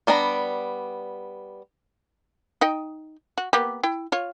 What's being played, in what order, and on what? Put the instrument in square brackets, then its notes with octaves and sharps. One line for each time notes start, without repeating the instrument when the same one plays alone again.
[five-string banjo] G3 B3 D4 A#5
[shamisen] D#4 D#5 G5
F#4
A#3 B3 G4
E4 G5
F4 C#5